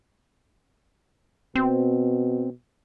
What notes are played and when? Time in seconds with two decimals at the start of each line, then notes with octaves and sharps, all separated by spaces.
1.55 B2 C4